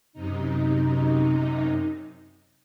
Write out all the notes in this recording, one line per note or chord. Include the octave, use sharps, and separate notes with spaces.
F#2 C3 D#4